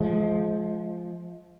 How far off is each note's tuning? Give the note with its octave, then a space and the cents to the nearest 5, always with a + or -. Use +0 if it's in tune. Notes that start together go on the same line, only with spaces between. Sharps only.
F3 +0 G#3 +30